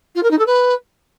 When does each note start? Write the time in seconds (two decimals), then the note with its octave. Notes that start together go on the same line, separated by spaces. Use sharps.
0.15 F4
0.23 A#4
0.31 D#4
0.39 A4
0.47 B4